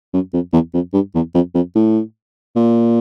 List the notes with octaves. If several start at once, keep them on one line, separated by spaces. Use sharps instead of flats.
F#2
F2
E2
F2
G2
E2
F2
F2
A2
A#2